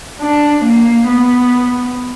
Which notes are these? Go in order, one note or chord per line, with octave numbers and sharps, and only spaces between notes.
D4
A#3
B3